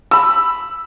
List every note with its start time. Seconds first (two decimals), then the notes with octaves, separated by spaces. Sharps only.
0.11 B5 E6